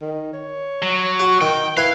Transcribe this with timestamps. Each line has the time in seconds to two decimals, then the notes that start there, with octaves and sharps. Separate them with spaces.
0.01 D#3
0.33 C#5
0.82 F#3
1.19 F#4
1.41 D#3 G5
1.77 E4 B4 F5 G#5